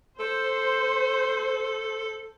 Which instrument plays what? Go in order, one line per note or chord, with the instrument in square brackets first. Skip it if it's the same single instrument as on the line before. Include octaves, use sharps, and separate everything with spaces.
[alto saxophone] A4 [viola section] C5